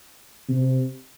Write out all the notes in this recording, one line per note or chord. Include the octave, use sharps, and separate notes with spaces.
C3